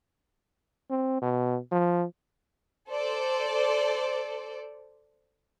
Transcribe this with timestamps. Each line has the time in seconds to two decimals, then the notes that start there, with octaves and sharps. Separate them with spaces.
0.90 C4
1.22 B2
1.72 F3
2.91 A4 C5 D5